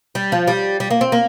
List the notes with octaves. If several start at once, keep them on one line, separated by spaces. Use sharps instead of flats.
G3
F3
G3
G3
A#3
C4
A#3